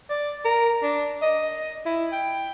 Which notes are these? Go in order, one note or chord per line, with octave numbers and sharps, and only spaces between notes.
D5
A#4
D4
D#5
E4
G5